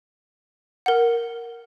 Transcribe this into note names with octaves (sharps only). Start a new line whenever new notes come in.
A#4 F#5